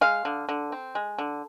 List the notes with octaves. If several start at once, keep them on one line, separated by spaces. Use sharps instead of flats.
G#3 F5
D3
D3
C4
G#3
D3